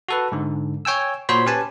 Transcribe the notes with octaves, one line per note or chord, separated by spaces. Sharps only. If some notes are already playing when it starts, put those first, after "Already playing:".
F#4 A4 B4
G#2 D3
C#5 G5 G#5 E6
A#2 F#4 C5 C#5 B5 C6
C#4 G4 B4 G#5 A5